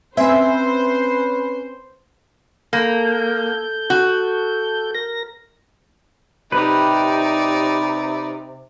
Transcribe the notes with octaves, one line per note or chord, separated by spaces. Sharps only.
C4 C#4 B4 C5 E5 G#5 C6
A#3 A4 G6
F#4
A#4 A#6
C3 D#4 G4 B4 D5